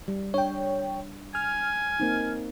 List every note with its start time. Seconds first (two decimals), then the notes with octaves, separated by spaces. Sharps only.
0.08 G3
0.34 D4 C#5 G5
1.35 G#5 F6
2.00 A#3 C4 D#4